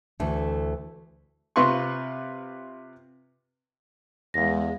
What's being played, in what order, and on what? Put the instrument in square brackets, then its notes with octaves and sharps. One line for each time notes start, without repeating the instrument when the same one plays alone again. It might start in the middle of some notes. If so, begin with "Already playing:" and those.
[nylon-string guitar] D2 E3 A3 D4
[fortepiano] C3 F4 B4 C6 C#6
[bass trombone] E2 [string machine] G#3 [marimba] F5 A#6